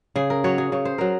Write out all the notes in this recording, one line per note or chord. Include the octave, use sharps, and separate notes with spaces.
C#3 G#4
A#4
F#3 C#5
G#4
C#3 C#5
C5
F#3 A#4